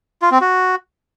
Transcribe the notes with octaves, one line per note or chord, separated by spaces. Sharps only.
F4
C4
F#4